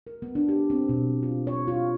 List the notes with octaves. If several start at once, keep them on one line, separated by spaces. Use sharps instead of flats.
A#4
B3
D4
G4
C4
B2
F4
C#5
F4